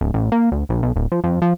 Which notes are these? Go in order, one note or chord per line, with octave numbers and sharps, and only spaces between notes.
D1
A1
A#3
D2
A#1
B1
D1
F3
F2
F3